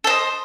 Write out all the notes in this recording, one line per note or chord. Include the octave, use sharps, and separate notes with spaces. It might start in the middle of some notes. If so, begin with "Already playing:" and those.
A4 C5 D#5